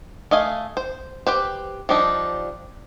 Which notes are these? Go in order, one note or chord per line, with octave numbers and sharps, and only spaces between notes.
A3 D#5 F5 G#5
C5
G4 B4 C5
F3 G3 D4 D#4